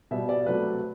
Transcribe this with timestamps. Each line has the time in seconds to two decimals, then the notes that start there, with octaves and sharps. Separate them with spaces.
0.11 B2 G3 E5
0.29 D5
0.46 C3 F#3 A3 B4